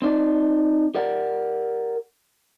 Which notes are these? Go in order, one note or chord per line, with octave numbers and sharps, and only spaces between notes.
C4 D#4 D5
G4 A#4 D5 F#5